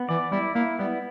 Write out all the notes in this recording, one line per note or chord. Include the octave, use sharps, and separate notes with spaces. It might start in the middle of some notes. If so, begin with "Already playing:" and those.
Already playing: B3
E3 D5
G3 E4
A#3 E4
G3 B3